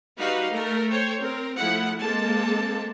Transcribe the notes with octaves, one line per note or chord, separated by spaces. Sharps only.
G3 D#4 F#4 B4 F5
A3 A4 A#4
A4 C5 C#5 G5
C4 A#4
F3 A3 E4 F#5
G#3 A#3 C4 A4 A5